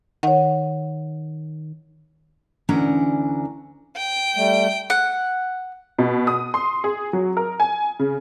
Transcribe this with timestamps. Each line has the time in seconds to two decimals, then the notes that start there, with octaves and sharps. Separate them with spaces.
0.23 D#3 C#5 F#5
2.69 D2 E3 C#4 D4 F#5 A#5
3.97 G5
4.36 G3 A3
4.90 F#5
5.99 B2
6.27 D#6
6.54 C6
6.84 G#4
7.13 F#3
7.37 A#4
7.60 G#5
7.99 C#3